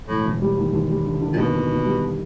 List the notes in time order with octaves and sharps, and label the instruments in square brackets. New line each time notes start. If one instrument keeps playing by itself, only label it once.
[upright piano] E1 [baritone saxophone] A2
[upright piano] E1
G3
D#2
D#2
G3
D3
D3
[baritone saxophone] A#2
[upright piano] D#2 [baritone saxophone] B2
[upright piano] D#2
D#2
G3